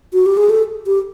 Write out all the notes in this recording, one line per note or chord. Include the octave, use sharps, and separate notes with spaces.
F#4
G4
G#4
A4
G4